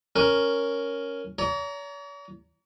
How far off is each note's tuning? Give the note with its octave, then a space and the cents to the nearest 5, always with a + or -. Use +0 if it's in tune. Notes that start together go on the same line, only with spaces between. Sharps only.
C#4 +0 A#4 +0
C#5 +45 A#5 +0